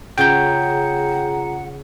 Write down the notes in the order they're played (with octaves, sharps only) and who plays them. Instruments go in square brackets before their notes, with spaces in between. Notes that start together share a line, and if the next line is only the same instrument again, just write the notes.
[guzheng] C#3 [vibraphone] F4 G#4 A#5 [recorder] F#5 [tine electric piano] G5 G6